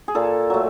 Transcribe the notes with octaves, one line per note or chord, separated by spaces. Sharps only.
G#4
A#2 A4
F#3 A3